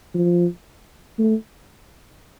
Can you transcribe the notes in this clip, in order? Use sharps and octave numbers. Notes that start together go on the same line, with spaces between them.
F3
A3